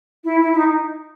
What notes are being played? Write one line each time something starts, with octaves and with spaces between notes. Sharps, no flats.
E4
E4
E4
D#4